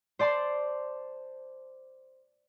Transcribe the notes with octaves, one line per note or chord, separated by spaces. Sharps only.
C5 D5 A5 C6